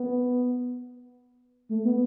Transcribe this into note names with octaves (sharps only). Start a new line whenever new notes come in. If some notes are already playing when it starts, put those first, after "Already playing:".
Already playing: B3
A3
B3